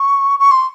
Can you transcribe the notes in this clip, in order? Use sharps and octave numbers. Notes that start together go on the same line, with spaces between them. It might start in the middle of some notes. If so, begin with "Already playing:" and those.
Already playing: C#6
C#6
C6